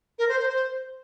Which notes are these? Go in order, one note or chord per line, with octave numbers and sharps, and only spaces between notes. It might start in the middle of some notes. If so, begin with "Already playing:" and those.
A#4
C5
C5
C5